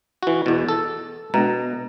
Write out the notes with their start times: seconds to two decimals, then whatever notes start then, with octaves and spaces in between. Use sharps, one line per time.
0.23 E3 F#4
0.46 E2 B2
0.69 A4
1.34 B2 G#3 B3 D4 A#5